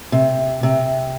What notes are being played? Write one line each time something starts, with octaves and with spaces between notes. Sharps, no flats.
C3
C3